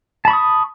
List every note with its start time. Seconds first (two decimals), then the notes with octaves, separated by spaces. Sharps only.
0.25 A5
0.28 B5
0.30 C#6
0.33 D#6